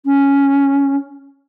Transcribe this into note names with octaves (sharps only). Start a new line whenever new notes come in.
C#4